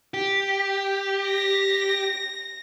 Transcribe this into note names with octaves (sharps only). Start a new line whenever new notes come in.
G4
A#6